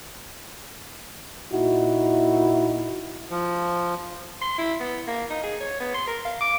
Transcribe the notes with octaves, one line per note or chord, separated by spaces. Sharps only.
A#2 D#4 E4 F#4
F3
C6
E4
B3
A#3
D#4
G#4
C#5
B3
C6
A#4
F5
D6